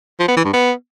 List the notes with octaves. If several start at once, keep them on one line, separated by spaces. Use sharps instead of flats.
F3
B3
E3
G2
B3